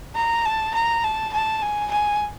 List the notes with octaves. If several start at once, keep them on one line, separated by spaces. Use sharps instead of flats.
A#5
A5
A#5
A5
A5
G#5
G#5